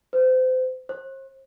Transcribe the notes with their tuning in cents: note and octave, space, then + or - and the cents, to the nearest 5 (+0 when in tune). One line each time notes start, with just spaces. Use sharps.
C5 -30
C5 +40